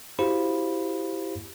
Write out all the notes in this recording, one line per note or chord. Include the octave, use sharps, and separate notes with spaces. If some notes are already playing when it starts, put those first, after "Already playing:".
E4 F#4 G4 C5 F5 B5